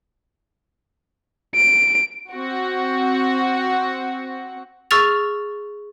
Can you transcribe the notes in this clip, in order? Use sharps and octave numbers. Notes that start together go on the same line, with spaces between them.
D7
C4 F#4
G#4 C#6 E6 F6 A6 F7